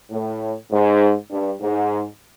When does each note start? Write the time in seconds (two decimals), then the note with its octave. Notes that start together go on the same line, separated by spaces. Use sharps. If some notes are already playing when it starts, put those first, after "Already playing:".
0.11 A2
0.71 G#2
1.31 G2
1.61 G#2